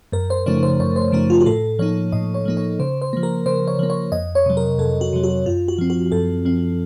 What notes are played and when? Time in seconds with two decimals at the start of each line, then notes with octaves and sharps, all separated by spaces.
0.12 F#2 A#4
0.30 C5
0.46 C#3 F3 A3 D#4 C#5
0.63 C5
0.80 F#2 C#5
0.96 C5
1.12 C#3 F3 A3 D#4 A#4
1.30 F4
1.41 F#4
1.46 A2 A4
1.79 F3 A#3 D#4 C#5
2.12 A2 D#5
2.34 C#5
2.45 F3 A#3 D#4
2.57 C#5
2.79 C#3 C5
3.02 C5
3.13 F3 A#3
3.23 A#4
3.46 C#3 C5
3.68 C#5
3.79 F3 A#3
3.90 C#5
4.12 F2 D#5
4.35 C#5
4.46 C3 F#3
4.57 A#4
4.78 F2 A4
5.01 F#4
5.13 C3 F#3
5.23 F#4
5.46 F#2 F4
5.68 F#4
5.78 F3 C4
5.90 F#4
6.12 F#2 A4
6.45 F3 C4